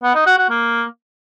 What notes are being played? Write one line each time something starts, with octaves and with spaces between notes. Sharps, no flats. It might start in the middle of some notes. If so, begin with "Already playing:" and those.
B3
D#4
F#4
F#4
A#3